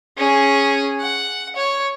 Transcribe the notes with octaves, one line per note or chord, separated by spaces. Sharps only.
C#4 G#4
F#5
C#5